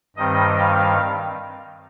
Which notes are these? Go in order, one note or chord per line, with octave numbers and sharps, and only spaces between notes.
G2 D#3 G3 C4 D#5
F5